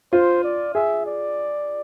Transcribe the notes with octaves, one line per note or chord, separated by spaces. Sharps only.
F4 C5
D5
G#4 E5
D5